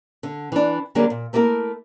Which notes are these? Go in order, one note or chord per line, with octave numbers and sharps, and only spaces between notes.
D3
E3 D4
D3 F#3 G3 A#3 D4 G#4
A#2
A3 A#3 E4 G#4 A#4